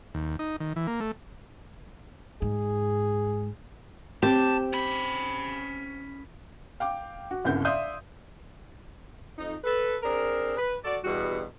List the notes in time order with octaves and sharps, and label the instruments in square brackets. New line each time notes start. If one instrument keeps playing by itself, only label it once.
[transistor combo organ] D#2
D#4
D#3
E3
A#3
A3
[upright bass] G#2 [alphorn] G#4
[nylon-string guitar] C4 [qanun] G4 [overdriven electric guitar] A5
[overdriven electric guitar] C#4 B5
[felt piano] F5 G5 D6
F#4
G1 C2 C#3 F#5 G6
D5 E5 F5 C6 D#6 G6
[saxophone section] F2 D#4
A4 B4
C4 D4 G#4 A#4
B4
F#4 A4 D5
E2 G2 B2 G3 F#4